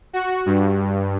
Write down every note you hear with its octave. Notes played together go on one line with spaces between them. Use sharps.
F#4
G2